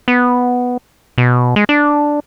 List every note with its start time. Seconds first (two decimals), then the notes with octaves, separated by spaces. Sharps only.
0.08 B3
1.18 B2
1.56 G#3
1.69 D4